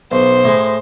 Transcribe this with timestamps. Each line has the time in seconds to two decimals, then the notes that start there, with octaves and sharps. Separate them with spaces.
0.12 B1 C5
0.44 A2 G#3